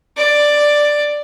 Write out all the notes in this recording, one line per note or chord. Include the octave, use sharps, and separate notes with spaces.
D5